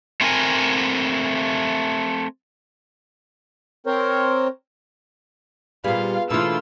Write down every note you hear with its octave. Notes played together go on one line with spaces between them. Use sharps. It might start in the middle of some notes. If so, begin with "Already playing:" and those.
A3 C4 D4 A#4 G#5
C4 A#4 C5 C#5
A#2 G3 B3 F4 G#4 B4 F5
B2 E3 A3 A#3 D4 E4 F4 E6